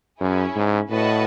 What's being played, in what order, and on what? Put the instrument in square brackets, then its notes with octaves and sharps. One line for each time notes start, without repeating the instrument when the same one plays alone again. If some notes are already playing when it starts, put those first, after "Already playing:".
[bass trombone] F#2 [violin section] C#4 E4 G#4
[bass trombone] G#2
[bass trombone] A2 [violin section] F#4 B4 D#5 F#5 A5